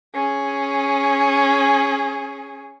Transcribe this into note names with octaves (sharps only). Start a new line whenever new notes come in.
C#4 G#4